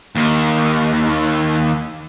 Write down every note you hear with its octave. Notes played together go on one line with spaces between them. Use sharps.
D#2 D#3